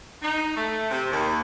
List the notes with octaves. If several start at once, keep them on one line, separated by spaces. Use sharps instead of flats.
D#4
A3
C3
D#2